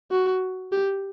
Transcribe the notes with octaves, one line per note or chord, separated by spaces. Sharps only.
F#4
G4